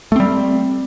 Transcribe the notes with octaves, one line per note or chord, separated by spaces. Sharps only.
G3 A3 C4